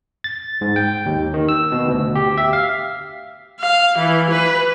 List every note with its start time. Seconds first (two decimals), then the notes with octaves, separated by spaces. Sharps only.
0.24 A6
0.61 G#2
0.76 G5
1.06 D#2
1.34 D#3
1.49 E6
1.72 B2
1.88 D2
2.15 G4
2.38 E5
2.53 F5
3.61 F5
3.98 E3
4.31 B4